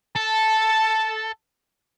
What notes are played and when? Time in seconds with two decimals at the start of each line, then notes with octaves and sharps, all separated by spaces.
0.16 A4 A5